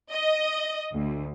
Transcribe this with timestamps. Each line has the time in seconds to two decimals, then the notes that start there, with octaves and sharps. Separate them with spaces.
0.11 D#5
0.94 D2